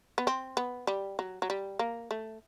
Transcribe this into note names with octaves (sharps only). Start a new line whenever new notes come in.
B3
C4
B3
G3
F#3
F#3
G3
A#3
A3